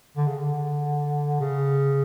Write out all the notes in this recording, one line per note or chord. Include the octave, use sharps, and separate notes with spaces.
D3
C#3
D3
C#3